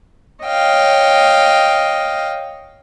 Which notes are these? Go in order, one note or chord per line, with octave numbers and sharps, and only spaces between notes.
C#5 D#5 F5 G5